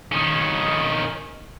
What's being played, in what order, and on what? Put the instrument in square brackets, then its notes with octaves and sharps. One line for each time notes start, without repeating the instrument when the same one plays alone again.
[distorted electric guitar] D#3 C#4